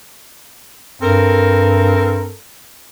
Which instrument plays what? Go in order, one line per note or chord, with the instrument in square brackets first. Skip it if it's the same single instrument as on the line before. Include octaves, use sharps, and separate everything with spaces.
[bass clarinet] G2 [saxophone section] C4 A4 A#4